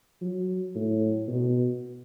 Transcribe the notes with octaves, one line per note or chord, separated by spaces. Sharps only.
F#3
A2
B2